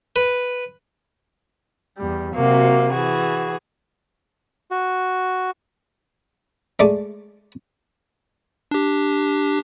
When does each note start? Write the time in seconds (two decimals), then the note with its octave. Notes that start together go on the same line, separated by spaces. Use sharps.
0.16 B4
1.97 E2 G3
2.35 C3 F#3 A#3 F#4
2.91 E3 F#4 G#4
4.71 F#4
6.79 G#3 A3 D5 D6
8.71 D4 G4